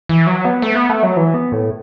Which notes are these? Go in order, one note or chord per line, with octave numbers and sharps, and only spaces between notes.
E3
F#3
B3
A3
B3
A3
F#3
E3
B3
A2